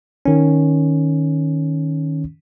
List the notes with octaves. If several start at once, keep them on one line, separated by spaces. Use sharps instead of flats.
D#3 C#4